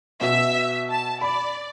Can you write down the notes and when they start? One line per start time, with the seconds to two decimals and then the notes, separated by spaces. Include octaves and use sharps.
0.21 B2 E5
0.90 A5
1.21 D5 B5